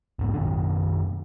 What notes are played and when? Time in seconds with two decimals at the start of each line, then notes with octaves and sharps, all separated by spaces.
0.19 E1 G#2 B2
0.34 F#2 B2 D#3 D4